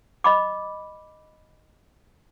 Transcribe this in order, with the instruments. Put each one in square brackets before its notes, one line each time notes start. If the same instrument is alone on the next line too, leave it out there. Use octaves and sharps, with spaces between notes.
[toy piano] D#5 B5 D6